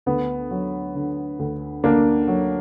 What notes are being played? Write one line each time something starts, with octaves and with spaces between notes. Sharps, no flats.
D2 B3
F#3
D3
D2
D2 A#3 D4
F#3